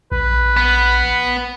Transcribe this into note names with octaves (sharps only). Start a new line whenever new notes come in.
A#1 B4
B3